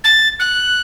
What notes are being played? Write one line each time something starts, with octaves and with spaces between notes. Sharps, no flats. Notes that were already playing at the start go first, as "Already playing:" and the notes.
A6
F#6